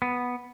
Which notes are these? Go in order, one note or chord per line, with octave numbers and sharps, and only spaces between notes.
B3